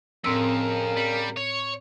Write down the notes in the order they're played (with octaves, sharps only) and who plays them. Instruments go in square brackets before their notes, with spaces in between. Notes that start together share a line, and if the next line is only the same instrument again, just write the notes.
[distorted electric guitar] F2 [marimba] A2 C4 E6 [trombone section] C#3 A#4
[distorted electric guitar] G3
C#5